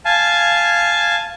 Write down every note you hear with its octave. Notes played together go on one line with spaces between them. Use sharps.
F5 G#5 A5